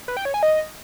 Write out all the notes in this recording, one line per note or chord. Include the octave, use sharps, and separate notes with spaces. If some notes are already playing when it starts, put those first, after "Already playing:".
B4
G5
C#5
G#5
D#5